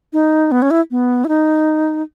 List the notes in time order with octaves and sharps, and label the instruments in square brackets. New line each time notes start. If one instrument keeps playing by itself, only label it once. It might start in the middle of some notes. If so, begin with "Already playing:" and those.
[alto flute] D#4
B3
C#4
E4
B3
E4
D#4